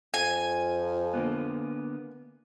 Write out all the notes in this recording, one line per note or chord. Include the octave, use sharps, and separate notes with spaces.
F2 G#5
D3 A#3 B3